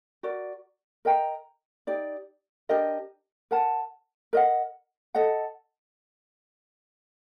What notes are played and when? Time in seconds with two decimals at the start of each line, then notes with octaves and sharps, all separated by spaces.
0.23 F#4 A#4 D5
1.05 A#4 D#5 G5 A#5
1.87 D#4 G4 D5
2.69 D4 G4 A#4 D#5
3.51 A#4 F#5 A5
4.33 A#4 D#5 F#5
5.15 A4 D#5 F#5